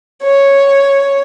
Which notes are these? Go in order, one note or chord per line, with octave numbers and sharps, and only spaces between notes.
C#5